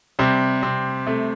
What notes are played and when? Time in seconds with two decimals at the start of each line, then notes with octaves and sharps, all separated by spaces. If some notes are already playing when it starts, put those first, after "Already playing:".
0.19 C3 G3 C4
0.63 C3 C4
1.07 C3 A3